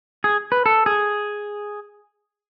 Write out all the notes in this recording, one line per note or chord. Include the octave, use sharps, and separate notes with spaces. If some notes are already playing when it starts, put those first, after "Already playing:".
G#4
B4
A4
G#4